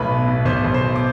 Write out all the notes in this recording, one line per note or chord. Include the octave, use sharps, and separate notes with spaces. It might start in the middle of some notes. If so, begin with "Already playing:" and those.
Already playing: B1 A2 B4 B5
B2
B2
B1 C5 C6
B1
C5 C6
B2
D6